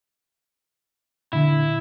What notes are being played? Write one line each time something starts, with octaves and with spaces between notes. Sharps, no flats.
A#2 D3 E4